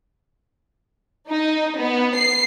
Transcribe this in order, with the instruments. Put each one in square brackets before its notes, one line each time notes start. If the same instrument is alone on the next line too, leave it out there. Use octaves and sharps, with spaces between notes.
[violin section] D#4
B3
C7